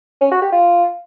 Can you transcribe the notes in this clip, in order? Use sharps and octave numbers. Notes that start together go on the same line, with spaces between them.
C#4
F#4
G4
F4